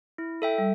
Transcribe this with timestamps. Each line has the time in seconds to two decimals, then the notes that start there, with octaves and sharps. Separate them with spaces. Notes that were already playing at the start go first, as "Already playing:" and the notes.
0.18 E4
0.42 A4 E5 G5
0.58 G3